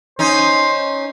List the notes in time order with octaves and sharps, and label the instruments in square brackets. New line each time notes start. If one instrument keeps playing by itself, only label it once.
[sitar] C#4 D#4 [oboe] C5